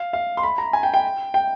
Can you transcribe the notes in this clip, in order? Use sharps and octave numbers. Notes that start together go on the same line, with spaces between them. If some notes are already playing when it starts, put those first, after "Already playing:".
Already playing: F5
F5
C6
B5
A#5
G#5
G5
G5
G5